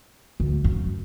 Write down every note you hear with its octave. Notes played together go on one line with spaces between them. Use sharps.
D2
F#2